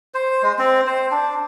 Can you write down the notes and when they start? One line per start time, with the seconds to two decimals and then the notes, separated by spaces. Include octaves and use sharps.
0.14 C5
0.42 G#3
0.59 C4
0.87 C5
1.11 D4